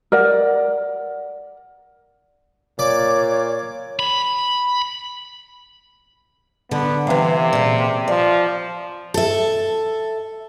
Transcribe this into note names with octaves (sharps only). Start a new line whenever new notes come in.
A#4 D5 F#5
A#2 C#5 D5
B5
D3 B3
C3 E3 F5
A#2 C#3
F3 D5
A4 E5